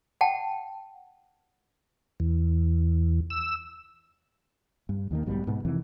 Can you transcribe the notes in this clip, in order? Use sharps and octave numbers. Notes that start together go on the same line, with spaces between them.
F#5 G5 A5
E2
E6
G2
D#2 D#3 A#3
B1 G#2 B2 G3
G#2 B2 B3
F2 C3 D#3 E3